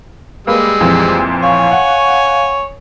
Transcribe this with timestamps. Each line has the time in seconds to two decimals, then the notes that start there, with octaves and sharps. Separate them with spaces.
0.47 G3 G#3 A#3 B4 E6
0.81 F2 A#2 E3
1.42 C#5 F5 G#5 C#6
1.72 F#5